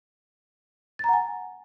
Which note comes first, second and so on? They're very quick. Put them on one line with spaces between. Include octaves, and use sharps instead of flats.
A6 A#5 F#5 G#5